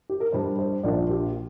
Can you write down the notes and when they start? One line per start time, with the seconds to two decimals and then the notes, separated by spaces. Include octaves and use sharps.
0.09 G4
0.20 A#4
0.32 G2 G3 D4 C5
0.59 C5
0.84 A#1 A#2 A#3 D4 D5
1.10 G4